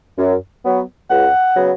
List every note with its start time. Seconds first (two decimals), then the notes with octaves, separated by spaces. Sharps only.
0.18 F#2
0.64 F#3 B3
1.09 C#2 F#5
1.55 C#3 F#3 B3